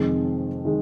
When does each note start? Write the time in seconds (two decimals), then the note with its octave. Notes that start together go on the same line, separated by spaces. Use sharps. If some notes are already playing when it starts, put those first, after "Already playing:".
Already playing: F1 F2 D#3 G#3
0.65 D#3 G#3